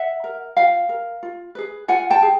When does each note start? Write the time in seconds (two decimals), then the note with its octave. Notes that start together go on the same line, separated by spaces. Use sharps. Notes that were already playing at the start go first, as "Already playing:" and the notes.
Already playing: E5 F#5
0.24 A#4
0.57 F4 F5 G5
0.89 A#4
1.23 F4
1.55 G#4 B4
1.88 F4 F#5 G#5
2.10 G5 A5
2.22 G#4